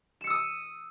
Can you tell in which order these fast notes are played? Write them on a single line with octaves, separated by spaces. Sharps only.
E7 C#7 E6 D#6